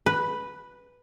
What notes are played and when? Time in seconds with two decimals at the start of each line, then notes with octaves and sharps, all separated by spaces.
0.06 B4